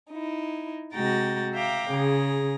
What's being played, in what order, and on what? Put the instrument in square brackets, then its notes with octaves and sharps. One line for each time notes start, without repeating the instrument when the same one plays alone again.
[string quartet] D#4 E4
C3 G#3 F#4 G5 A#5 A6
E5 F5 G5 A#5 D6
C#3 G#4 A#5